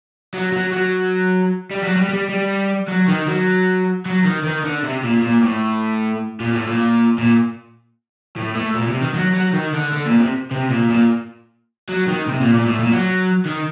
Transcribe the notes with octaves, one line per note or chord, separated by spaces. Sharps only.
F#3
F#3
F#3
G3
F#3
G3
G3
G3
F#3
D#3
F#3
F#3
D#3
D#3
D3
C3
A#2
A#2
A2
A#2
A2
A#2
A#2
A2
A2
A#2
C3
D#3
F#3
F#3
D#3
D3
D3
A#2
C3
C3
A#2
A#2
F#3
D#3
C3
A#2
A#2
A2
A#2
F#3
D#3